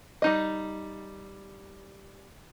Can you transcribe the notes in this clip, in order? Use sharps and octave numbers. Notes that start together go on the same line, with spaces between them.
G3 D#4 D#5